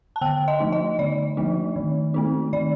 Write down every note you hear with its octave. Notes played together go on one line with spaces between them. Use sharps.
A5
D3 G5
D#5
F3 A3 D#4
D#5
D3 D5
F3 A3 D#4
D#3
A3 C4 D#4
D#3 D5